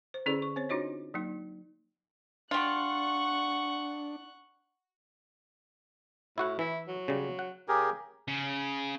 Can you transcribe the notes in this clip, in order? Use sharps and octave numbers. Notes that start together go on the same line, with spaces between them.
C5
D3 C#4 E4 G#4 A4 D5
C#6
C4 C5 C#5
D4 D#4 F4 F#4 C#5 D#5
F#3 A#3 D#4
G3 D4 F4 F#5 C#6 F#6
A2 E4 F#4 F#5
E3 E4
F#3
C#3 G3
F#5
C#3 G4 G#4 A#4
C#3